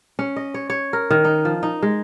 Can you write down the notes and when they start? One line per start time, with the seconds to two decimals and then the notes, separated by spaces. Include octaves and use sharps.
0.19 C#4
0.36 D#5
0.54 C#5
0.70 C#5
0.93 A#4
1.11 D#3
1.24 D#4
1.45 F3
1.63 D#4
1.82 G#3